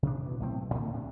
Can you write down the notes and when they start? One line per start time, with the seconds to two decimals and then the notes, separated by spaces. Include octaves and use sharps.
0.03 C3 D4
0.23 B2 E3
0.40 B1 A2 C4
0.58 B1
0.75 A2 D3 D#3 A3
0.93 D2 C3 D4